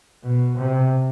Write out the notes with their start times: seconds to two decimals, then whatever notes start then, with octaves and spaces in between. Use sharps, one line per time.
0.23 B2
0.58 C3